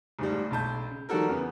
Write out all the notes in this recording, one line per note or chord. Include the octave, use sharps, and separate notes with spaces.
D1 G#2 G3
E1 B1 A5 G6
C#3
D#3 F3 G3 F#4 A4 A#4
E2 C#3 B3